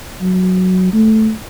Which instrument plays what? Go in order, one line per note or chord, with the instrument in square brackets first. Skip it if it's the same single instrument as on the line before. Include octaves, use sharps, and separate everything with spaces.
[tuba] F#3
A3